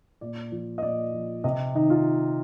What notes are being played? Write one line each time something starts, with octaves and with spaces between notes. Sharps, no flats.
A#2 D5
F3
D#5
A#2 D5
F3
C3 D#5
D#3 D#4
F4